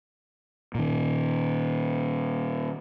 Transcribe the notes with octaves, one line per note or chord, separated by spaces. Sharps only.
A#2 D#3